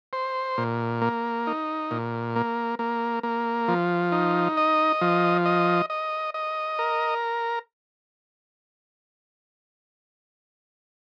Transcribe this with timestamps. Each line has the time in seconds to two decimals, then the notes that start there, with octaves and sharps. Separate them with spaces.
0.13 C5
0.58 A#2
1.01 A#3
1.47 D#4
1.91 A#2
2.36 A#3
2.79 A#3
3.23 A#3
3.68 F3
4.12 D#4
4.57 D#5
5.01 F3
5.46 D#5
5.90 D#5
6.34 D#5
6.79 A#4